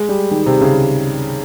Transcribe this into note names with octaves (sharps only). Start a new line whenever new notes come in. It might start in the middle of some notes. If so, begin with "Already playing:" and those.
Already playing: G#3
G3
D#3
C3
C#3